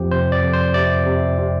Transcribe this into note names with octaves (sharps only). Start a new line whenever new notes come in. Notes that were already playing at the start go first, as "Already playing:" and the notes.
Already playing: F2 F3 G4
C3 C5
D5
F2
C5
C3 D5
C3
C3